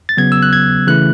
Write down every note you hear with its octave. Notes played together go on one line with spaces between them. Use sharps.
A6
C#3 F#3 B3 G#6
E6
F#6
G#6
C#3 E3 A3 E4 F#6